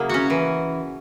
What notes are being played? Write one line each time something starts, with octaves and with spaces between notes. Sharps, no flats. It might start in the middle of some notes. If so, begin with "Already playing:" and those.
Already playing: C#3 F#3 A#3 E4 G#4
C#4 F#4
E3